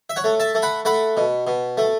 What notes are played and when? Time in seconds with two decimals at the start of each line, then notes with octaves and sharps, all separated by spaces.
0.10 E5
0.16 C#5 F#5
0.24 A3
0.40 E5 A5
0.55 A3
0.62 F#5 B5
0.85 A3 F#5 B5
1.17 B2
1.47 B2
1.78 A3